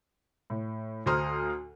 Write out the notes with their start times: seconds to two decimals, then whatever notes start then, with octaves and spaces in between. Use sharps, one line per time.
0.50 A2
1.06 D2 C5 A#5 C6 D#6 F6